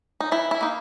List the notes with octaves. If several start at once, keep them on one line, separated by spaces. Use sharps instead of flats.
D#4
E3 E4
E4
A#3 D#4